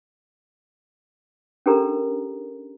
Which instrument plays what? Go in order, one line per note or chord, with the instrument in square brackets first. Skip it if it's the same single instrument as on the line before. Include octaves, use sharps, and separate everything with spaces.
[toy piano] C#4 D4 G4 A4 A#4 A#5